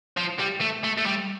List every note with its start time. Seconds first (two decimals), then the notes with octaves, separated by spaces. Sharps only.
0.17 F3
0.40 G3
0.61 A3
0.84 A3
0.98 A3
1.06 G3